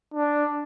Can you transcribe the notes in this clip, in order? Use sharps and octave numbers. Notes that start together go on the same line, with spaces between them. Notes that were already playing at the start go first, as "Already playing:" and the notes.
D4